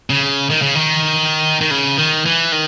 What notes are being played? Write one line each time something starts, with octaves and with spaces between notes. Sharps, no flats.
C#3
D#3
C#3
D#3
D#3
C#3
D#3
E3
D#3